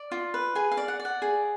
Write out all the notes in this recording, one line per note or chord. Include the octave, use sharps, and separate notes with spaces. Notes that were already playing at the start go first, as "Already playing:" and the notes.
Already playing: D5
F4
B4
G#4 G#5
F5
D5
F#5
D5
F#5
G#4